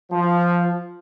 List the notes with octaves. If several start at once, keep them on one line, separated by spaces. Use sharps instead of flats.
F3